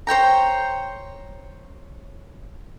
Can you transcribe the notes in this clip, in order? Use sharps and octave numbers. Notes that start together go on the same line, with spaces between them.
C5 C#5 G5 A#5